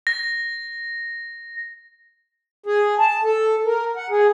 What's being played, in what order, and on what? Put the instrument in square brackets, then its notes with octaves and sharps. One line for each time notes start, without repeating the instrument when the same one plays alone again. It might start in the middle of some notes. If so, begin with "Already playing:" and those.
[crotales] A#6
[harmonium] G#4
A5
A4
A#4
F#5
G#4